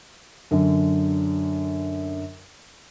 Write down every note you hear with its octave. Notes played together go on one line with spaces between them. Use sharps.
F#2 D3